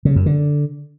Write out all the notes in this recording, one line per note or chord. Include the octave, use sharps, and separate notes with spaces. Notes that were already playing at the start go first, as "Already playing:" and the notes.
C#3
F#2
D3